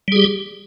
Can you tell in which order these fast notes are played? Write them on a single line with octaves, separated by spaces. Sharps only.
G3 G#4 G4